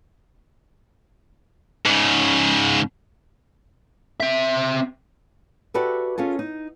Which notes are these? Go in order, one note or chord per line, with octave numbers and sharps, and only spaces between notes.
G#2 C#3
C4 E5
F#4 G4 A4 B4 D5 E5
C#4 F4 G#4 A4
D#4